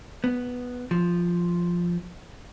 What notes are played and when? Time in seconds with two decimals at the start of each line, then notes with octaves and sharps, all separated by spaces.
0.24 B3
0.91 F3